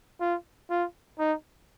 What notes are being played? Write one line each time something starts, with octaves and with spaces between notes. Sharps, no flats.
F4
F4
D#4